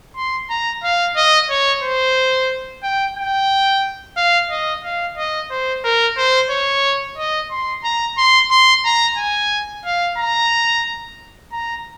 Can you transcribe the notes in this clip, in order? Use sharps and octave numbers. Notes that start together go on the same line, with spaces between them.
C6
A#5
F5
D#5
C#5
C5
G5
G5
F5
D#5
F5
D#5
C5
A#4
C5
C#5
D#5
C6
A#5
C6
C6
A#5
G#5
F5
A#5
A#5